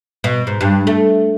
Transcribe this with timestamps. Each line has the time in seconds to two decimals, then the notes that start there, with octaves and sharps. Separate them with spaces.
0.24 B2
0.47 G#2
0.61 G2
0.87 A3